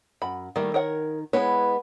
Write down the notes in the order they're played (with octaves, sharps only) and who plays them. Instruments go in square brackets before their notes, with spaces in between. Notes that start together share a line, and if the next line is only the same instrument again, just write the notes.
[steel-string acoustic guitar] F#2 [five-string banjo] B5
[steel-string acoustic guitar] D#3 [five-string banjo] G3 A3 A#3
[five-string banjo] A#4 C#5 F#5
[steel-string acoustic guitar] G#3 B3 B4 [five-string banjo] E4 C#5